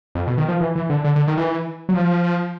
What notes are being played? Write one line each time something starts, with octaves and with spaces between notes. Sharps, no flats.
F2
B2
D#3
F3
E3
E3
D3
D3
D3
D#3
E3
F#3
F3